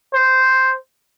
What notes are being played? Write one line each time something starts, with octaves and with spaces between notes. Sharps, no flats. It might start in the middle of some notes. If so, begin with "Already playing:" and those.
C5